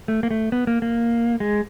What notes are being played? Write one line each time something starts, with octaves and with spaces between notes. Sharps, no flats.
A3
A#3
A3
B3
A#3
A#3
G#3